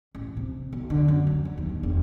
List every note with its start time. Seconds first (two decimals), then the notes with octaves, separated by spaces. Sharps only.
0.15 A1
0.37 C3
0.73 B1
0.90 D3
1.08 F#2
1.27 F#3
1.45 F#3
1.58 D#2
1.69 G1
1.83 E1